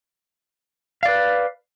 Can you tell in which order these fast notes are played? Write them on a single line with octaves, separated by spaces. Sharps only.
F5 D5 B4